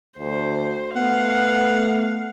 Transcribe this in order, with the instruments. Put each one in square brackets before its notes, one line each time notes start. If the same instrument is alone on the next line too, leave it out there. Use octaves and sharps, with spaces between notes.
[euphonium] D2 [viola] C5
[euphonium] A3 [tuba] B3 [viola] F5 [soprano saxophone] F#5